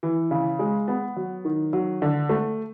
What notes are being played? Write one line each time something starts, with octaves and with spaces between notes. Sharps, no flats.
E3
C#3
G#3
B3
F#3
D#3
F#3
D3
A3